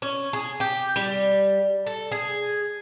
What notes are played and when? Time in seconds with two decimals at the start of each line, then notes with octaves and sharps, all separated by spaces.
0.02 C#4
0.33 G#4
0.60 G4
0.96 G3
1.87 A4
2.12 G#4